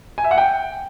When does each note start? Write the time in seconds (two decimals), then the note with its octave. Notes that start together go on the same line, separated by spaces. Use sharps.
0.18 G#5
0.24 E5
0.31 F#5
0.38 G5